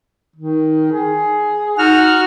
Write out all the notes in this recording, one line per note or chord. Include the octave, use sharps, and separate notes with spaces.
D#3
G#4
D#4 F#4 F6